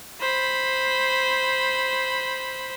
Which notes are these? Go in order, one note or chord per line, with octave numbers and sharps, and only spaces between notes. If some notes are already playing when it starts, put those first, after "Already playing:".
C5 B5